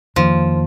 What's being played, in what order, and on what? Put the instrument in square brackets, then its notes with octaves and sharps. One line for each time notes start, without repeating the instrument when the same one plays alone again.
[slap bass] F2 D#3 A#3 [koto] F3